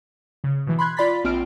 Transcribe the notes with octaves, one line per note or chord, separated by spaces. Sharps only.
C#3
B2 E3
B5 C6 F#6 G#6
F4 D5 B5 C6 A6 B6
A#1 C4 F4 F6 D7